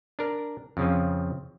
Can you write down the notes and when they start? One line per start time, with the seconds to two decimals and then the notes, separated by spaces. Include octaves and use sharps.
0.19 D4 A#4
0.77 F2 C#3 F3